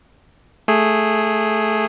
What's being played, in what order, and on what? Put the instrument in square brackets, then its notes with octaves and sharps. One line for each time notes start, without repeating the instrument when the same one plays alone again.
[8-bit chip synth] A3 G#4